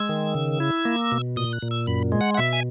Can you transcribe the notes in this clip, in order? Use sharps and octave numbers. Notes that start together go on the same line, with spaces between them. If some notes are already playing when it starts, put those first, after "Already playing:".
Already playing: G#3 E6
D#3
C#3
E4
A#3
B2
A#2 D#6
F#6
A#2
E6
F#2 B5
G#3
F#5
F#5
B2 E5
G#5